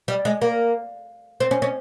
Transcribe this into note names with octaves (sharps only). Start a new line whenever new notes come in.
G3
G#3
A#3
C4
C#4
C#4